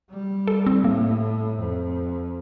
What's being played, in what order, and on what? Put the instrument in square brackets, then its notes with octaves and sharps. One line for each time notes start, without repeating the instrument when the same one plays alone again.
[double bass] G3
[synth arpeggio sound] A4
C4
[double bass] A2 [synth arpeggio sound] A#3
[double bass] F2